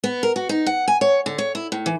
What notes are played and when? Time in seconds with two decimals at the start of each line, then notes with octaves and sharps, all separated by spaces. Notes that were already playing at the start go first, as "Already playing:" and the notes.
0.04 B3
0.23 A#4
0.36 F#4
0.49 D#4
0.66 F#5
0.88 G#5
1.01 C#5
1.26 D3
1.38 C#5
1.55 E4
1.72 A2
1.86 E3